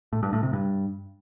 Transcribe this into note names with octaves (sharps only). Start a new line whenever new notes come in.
A2
G2
A2
C3
G2